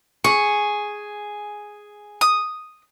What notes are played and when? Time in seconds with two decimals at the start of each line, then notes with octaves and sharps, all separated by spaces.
0.24 G#4 C#6
2.21 D#6